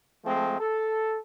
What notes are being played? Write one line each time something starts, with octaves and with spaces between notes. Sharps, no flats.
F3 G#3 A3 C4
A4